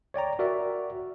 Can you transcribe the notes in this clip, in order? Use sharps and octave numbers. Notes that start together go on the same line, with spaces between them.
C#5 D5 G5 A#5
F#4 A#4 D5 E5